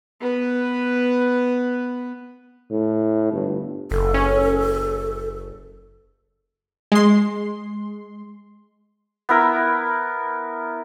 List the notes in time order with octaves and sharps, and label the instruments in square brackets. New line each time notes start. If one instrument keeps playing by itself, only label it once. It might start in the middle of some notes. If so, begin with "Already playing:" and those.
[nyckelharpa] B3 B4
[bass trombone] A2
G1
[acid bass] F#1 [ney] A4
[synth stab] C#4
G#3 C6
[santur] B3 E4 A#4